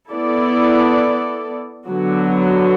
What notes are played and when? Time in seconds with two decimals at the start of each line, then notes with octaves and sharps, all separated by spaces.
0.10 B3 E4 A4 D5
1.87 D3 F#3 B3 F#4